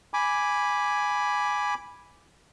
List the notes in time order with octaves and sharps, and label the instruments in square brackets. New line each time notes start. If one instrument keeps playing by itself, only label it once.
[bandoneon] G#5 B5 D6